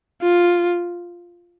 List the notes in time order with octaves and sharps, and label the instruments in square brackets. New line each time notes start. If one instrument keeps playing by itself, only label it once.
[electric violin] F4